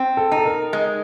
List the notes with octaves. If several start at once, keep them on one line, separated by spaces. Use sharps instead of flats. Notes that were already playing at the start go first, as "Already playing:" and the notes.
Already playing: C4
A4
D#4
A4
A#4
G#3